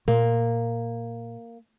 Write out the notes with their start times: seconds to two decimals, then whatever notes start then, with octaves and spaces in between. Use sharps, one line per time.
0.08 A#2 A#3